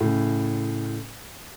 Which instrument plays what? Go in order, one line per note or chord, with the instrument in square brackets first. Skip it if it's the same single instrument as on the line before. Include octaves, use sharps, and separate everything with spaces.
[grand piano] A2 C#3